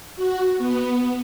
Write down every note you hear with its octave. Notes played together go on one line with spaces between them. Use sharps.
F#4
B3